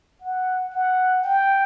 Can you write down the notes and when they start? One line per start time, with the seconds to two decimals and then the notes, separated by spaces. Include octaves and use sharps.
0.21 F#5
0.71 F#5
1.23 G5